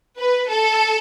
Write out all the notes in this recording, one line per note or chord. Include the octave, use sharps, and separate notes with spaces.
B4
A4